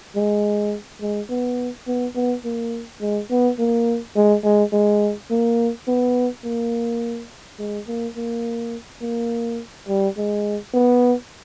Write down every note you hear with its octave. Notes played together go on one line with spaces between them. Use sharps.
G#3
G#3
B3
B3
B3
A#3
G#3
B3
A#3
G#3
G#3
G#3
A#3
B3
A#3
G#3
A#3
A#3
A#3
G3
G#3
B3